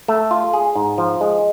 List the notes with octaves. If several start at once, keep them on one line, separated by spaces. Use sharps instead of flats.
A3
F4
G#4
G#2
F3
G#3